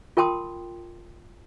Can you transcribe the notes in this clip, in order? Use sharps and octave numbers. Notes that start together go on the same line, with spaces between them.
F4 A#4 G5 A5 C6 D#6